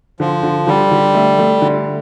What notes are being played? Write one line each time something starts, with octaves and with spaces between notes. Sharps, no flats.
D3 F3
D3
D3 G3
D3
A3
A3
D3